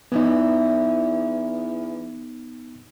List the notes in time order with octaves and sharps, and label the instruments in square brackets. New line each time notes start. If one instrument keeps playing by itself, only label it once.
[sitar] E2 A2 E3 [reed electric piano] B3 D#4